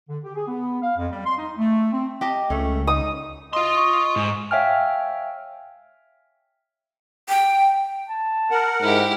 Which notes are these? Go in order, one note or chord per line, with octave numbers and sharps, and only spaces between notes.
D3
G4
G#4
B3
F5
F2
G3
C6
D#4
A3
C4
G4 D#5 A5
C#2 A3 C#4
D#4 D#6
F4 D#5 C6
C#6
G#2
C#5 E5 F5 G5 G#5 F6
G5
A5
A#4 F#5
G#2 E4 G4